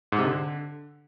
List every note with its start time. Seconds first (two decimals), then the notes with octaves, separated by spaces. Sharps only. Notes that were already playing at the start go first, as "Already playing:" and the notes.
0.12 G#2
0.19 C3
0.25 D3